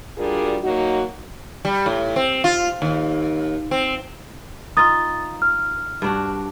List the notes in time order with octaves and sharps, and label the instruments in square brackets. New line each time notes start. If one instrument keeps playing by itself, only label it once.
[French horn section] G3 D4 F4 F#4 G#4 A#4
F#3 A#3 D#4 F#4
[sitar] G3
A2
C4
F4
D#2
C4
[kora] D#4 F4 [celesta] D#6 A6
[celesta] F6
[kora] G2 D4 F#4